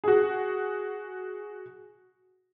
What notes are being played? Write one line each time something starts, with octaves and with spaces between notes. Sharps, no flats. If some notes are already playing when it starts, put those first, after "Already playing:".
F#4 G#4